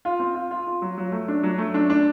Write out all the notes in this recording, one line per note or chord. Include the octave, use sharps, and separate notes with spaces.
F4
C4
F4
F4
F4
F#3
F#3
A3
D4
F#3
A3
D4
D4